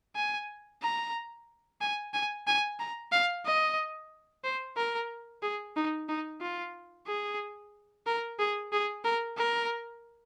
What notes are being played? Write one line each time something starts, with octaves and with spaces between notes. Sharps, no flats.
G#5
A#5
G#5
G#5
G#5
A#5
F5
D#5
C5
A#4
G#4
D#4
D#4
F4
G#4
A#4
G#4
G#4
A#4
A#4